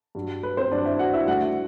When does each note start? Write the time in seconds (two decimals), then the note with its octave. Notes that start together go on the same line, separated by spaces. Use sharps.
0.15 G2 F#3
0.43 B4
0.57 C4 C5
0.72 G2 F#3 D4 D5
0.86 E4 E5
0.99 F#4 F#5
1.14 E4 E5
1.27 D2 D3 G3 F#4 F#5